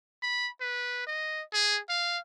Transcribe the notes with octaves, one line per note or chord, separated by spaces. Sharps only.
B5
B4
D#5
G#4
F5